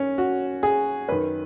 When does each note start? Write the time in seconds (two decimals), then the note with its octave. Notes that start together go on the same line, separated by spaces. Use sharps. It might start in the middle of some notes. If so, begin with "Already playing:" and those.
Already playing: F#2 D#3 C#4
0.18 F#4
0.63 G#4
1.08 F#2 D#3 B4